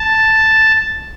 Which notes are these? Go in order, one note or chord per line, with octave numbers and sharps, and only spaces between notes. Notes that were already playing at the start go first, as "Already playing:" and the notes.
Already playing: A5